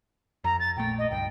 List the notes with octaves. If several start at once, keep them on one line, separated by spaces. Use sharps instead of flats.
F2 A#5
A6
A#1 A#2 A3 G5
D#5
C#2 G2 G5